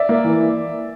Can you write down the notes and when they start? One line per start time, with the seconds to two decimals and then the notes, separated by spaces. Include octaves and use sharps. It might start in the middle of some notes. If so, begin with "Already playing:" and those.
Already playing: D5 E5
0.09 A#3
0.24 E3